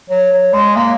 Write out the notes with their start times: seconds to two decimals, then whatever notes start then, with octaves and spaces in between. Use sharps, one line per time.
0.10 F#3
0.32 F#3
0.53 G#3
0.76 A#3